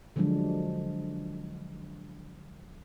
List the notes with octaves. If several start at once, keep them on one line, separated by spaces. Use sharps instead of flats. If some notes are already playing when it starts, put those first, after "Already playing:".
D3 F3 F#3 G#3 D4